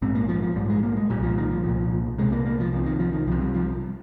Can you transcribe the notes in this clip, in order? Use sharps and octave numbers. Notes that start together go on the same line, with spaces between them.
A#1 G#2 C4
A#3
F3
F3
A#1 G#2 G3
G#3
A#3
G#3
A#2 G3
C2
F3
D#3
F3
C2 A#2
C2 C3 G#3
A#3
A#3
F3
C2 C3 F3
D#3
F3
D#3
C2 C3 F3
G3
F3